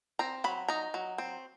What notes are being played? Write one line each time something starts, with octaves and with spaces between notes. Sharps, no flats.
C4 A#5
F#3 B5
D#4 A#5
F#3
C4